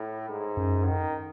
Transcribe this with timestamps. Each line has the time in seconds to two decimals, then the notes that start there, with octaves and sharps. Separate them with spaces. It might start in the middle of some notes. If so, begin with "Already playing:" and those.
Already playing: A2
0.29 G#2
0.57 F#2
0.85 D#3